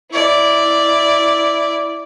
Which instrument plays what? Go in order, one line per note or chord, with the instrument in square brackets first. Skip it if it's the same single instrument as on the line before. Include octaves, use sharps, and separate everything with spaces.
[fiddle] E4 D5